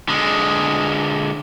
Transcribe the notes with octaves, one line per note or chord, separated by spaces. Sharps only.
D3 G#3